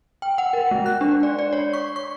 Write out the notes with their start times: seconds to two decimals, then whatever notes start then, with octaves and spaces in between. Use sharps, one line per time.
0.22 G5
0.38 F#5
0.53 A#4
0.71 G#3
0.86 F#6
1.01 D4
1.23 D5
1.39 D5
1.53 C#5
1.73 C#6
1.96 C#6